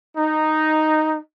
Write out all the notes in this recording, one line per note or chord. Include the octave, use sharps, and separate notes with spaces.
D#4